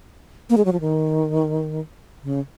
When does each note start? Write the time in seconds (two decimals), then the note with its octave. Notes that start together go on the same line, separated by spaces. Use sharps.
0.50 A#3
0.57 G#3
0.65 F#3
0.72 F3
0.80 D#3
2.23 C#3